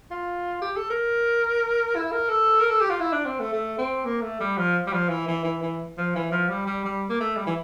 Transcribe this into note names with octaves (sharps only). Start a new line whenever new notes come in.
F4
G4
A4
A#4
E4
A#4
A4
A#4
A4
G4
F4
E4
D4
C4
A3
A3
C4
A#3
A3
G3
F3
G3
F3
E3
E3
E3
E3
F3
E3
F3
G3
G3
G3
A#3
A3
G3
E3